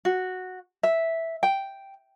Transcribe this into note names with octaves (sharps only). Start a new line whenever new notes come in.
F#4
E5
G5